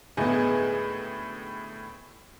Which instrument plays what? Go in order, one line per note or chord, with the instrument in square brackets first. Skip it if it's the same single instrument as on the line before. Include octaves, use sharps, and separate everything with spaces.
[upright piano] D2 A2 [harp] G#3 [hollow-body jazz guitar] B3 D#4 G#4